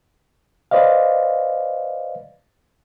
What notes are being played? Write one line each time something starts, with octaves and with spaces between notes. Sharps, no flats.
B4 C5 D5 D#5 F5